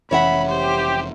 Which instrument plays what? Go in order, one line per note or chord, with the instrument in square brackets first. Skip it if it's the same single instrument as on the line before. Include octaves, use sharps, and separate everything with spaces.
[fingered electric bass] F1 E3 C#4 [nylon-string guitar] C#5 E5 F#5 [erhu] B5
[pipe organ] G4 [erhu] C5